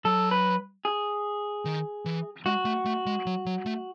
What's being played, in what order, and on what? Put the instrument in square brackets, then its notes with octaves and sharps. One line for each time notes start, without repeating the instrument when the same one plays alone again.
[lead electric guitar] F#3 [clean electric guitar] A4
[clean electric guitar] B4
G#4
[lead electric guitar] D#3
E3
[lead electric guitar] G#3 [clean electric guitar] F#4
[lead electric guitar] A3
A3
G#3
F#3
F#3
A3